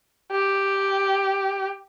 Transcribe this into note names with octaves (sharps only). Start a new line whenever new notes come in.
G4